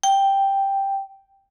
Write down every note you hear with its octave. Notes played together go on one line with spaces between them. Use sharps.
G5